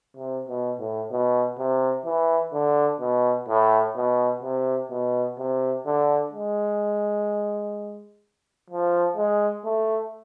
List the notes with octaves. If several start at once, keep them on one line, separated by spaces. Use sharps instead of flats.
C3
B2
A2
B2
C3
E3
D3
B2
A2
B2
C3
B2
C3
D3
G#3
F3
G#3
A3